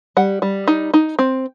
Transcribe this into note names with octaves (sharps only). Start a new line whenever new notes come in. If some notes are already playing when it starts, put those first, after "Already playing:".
G3 F#5
G3
D#4
D#4
C4